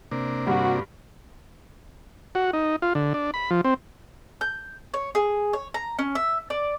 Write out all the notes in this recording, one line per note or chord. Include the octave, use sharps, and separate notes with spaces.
C3 A#3 D4
G2 F#4
F#4
D#4
F4
D3
D4
B5
F3
C4
G6
C#5
G#4
C#5
A#5
C#4
E5
D5